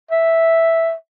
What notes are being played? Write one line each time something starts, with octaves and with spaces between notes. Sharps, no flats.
E5